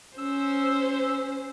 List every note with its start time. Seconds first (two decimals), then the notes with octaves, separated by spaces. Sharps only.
0.18 C#4 C5 E6